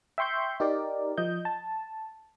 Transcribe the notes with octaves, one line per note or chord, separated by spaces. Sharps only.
E5 G5 C6 C#6 G6
D#4 G4 A#4 D5
F3 D#5 G6
A5